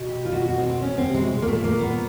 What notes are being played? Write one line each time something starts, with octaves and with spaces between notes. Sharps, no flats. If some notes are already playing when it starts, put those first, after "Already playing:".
Already playing: B2
G4
F4
F#4
F#4
C4
C4
C#4
C4
C3
G#3
B2
A#2
A#3
A3
A#3
B3